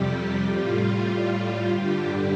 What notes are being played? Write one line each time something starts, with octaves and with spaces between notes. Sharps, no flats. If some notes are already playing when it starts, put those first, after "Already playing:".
Already playing: F2 C3 G3 G4
A2 G3 F4
G2 D3 G3 G4